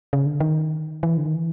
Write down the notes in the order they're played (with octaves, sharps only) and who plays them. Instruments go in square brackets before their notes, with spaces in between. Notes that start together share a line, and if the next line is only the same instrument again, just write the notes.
[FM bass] C#3
D3
D#3
E3
D3
D#3
E3